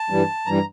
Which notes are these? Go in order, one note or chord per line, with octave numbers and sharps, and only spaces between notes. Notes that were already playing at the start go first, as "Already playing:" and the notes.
Already playing: A5
G2 E3 G3
G2 E3 G3 A#5